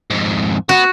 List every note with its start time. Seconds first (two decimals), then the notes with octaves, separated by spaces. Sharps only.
0.10 F2 G#2
0.69 B3 F#4